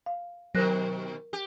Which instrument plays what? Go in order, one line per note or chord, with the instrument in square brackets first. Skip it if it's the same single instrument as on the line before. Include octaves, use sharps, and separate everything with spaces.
[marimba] F5
[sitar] B2 D#3 [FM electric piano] F#3 [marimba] A#4 F#6 A#6
[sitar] G4